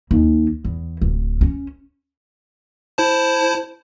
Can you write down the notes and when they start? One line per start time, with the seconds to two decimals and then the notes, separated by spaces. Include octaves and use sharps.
0.11 D#2
0.64 E2
1.02 D1
1.41 C#4
2.98 E4 C5 A5